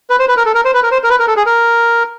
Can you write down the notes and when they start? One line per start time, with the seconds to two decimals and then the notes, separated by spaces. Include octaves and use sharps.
0.10 B4
0.19 C5
0.28 B4
0.37 A#4
0.46 A4
0.55 A#4
0.65 C5
0.74 B4
0.83 A#4
0.91 C5
1.03 A#4
1.10 B4
1.19 A#4
1.27 A4
1.36 G#4
1.46 A#4